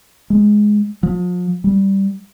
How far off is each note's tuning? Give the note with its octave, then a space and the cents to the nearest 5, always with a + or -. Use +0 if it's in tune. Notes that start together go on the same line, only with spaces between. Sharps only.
G#3 +5
F3 +40
G3 -5